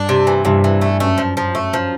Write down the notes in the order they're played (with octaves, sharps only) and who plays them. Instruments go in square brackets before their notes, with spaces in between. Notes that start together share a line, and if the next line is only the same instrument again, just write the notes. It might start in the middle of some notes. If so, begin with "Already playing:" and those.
Already playing: [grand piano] G2 [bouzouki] D4
[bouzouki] C3
E3
[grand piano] G2 [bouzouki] C3
[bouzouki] E3
A3
[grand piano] F#2 [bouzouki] A3
[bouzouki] F3
F3
A3
F3